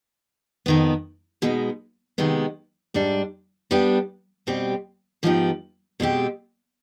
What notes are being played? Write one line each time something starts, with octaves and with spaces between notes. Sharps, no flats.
F2 D#3 B3
B2 G#3 B3 D#4
C3 D#3 G#3 B3
G#2 G3 D4
G3 B3 D4 G4
B2 G3 C4 G4
G#2 F3 B3 D#4 G4
B2 G#3 C4 G4